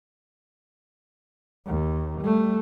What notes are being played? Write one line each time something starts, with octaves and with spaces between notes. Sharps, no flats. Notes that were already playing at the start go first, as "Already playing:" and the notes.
D#2
G3 A3